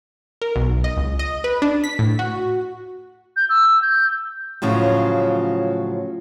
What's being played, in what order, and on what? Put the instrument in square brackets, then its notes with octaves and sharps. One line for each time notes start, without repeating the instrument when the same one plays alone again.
[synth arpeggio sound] A#4
B1
D#5
C#2
D#5
B4
D4
B6
A2
F#4
[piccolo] G6
E6
G6
[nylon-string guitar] A2 C#3 F3 F#3